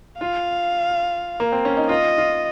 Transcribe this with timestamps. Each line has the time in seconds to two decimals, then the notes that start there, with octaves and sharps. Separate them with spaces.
0.20 F4 F5
1.40 A#3
1.52 C4
1.65 C#4
1.77 D#4
1.89 F4 D#5
2.18 F4